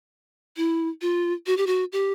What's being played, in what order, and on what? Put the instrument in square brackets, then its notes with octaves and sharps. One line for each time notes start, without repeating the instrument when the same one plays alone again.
[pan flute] E4
F4
F#4
G4
F#4
G4